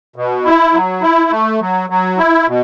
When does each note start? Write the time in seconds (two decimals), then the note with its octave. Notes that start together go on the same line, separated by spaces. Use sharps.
0.16 B2
0.45 E4
0.73 F#3
1.02 E4
1.31 A3
1.61 F#3
1.90 F#3
2.18 E4
2.47 B2